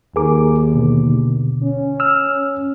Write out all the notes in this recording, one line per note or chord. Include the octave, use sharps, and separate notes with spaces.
D#2 G#4 A#4 D6
B2 D3
C#4
E6 F6